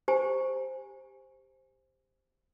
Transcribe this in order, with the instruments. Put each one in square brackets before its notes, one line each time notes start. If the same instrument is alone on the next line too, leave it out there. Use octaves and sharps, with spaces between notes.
[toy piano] G4 C5 G#5 A#5